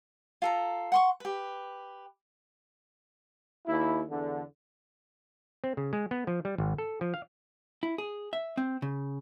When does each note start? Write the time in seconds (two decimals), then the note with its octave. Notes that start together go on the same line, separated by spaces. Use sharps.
0.42 F4 A4 A#5
0.92 F#5 C6 C#6
1.20 G4 B4
3.67 D#2 E4
4.10 E2 D3
5.64 C4
5.77 C#3
5.93 G#3
6.11 B3
6.27 F3
6.45 G3
6.58 G#1
6.78 A4
7.01 F3
7.14 F5
7.83 E4
7.98 G#4
8.33 E5
8.57 C4
8.82 C#3